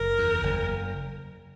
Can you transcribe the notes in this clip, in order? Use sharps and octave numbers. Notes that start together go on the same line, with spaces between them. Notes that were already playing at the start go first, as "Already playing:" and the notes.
Already playing: F#1 A#4
E2
F#1